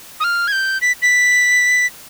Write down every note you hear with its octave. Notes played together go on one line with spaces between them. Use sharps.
D#6
F6
G#6
G6
B6
B6